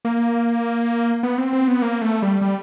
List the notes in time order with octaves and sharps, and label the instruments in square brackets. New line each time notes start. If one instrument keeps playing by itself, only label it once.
[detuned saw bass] A#3
B3
C4
C4
B3
A#3
A3
G3
G3